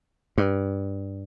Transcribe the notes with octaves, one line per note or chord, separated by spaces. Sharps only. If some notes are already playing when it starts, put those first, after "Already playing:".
G2